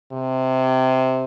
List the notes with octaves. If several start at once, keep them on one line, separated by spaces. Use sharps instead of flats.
C3